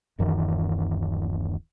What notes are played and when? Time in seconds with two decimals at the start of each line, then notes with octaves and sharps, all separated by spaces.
0.19 D1 F#2 D#3 E3